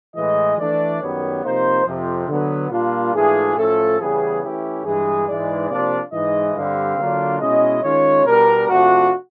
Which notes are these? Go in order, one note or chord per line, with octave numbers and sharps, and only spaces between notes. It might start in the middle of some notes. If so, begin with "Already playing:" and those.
A2 E3 G#3 D#5
E3 A3 D4 D5
F#2 D#3 G3 B3 C#5
C3 F3 A#3 D#4 C5
F2 C3 F3
D3 F#3 B3
A#2 G3 A#3 D4 F4
G#2 E3 A3 D4 F4 G#4
A2 F3 A3 C#4 F4 A4
E2 C#3 E3 G3 B3 G#4
E3 A3 C#4 E4 G4
G2 E3 G#3 G#4
G#2 E3 G#3 D5
C3 F3 A#3 D4 F4 D5
G#2 E3 G#3 D#5
G2 D3 G3 C4 F5
D3 F#3 A#3 D4 F4
B2 G#3 C#4 E4 D#5
D#3 G#3 C#4 F4 C#5
B2 G3 B3 D4 A#4
C3 F3 A3 D4 F4 F#4